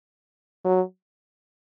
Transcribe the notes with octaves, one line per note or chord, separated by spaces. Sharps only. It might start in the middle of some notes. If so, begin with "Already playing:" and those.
F#3